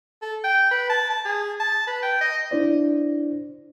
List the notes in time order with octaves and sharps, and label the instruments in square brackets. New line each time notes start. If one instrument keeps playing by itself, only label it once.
[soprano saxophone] A4
G5
B4
A5
A5
G#4
A5
B4
G5
D#5
[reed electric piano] D4 E4 C5 D5